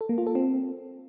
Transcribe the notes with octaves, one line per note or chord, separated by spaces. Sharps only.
A4
A#3
F4
A4
C4